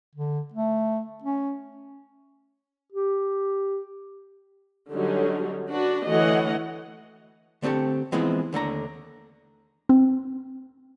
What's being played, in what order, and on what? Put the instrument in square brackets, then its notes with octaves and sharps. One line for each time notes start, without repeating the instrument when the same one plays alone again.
[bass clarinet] D3
A3
C#4
[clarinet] G4
[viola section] D3 F#3 G3 C#4 D#4
D4 F#4 B4
D3 E3 A3 C#5 D#5 F#5
[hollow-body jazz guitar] D3 A3 C4 G4 A4
E3 F3 G#3 B3 C4 E4
D#2 D3 A3 A#5
[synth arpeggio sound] C4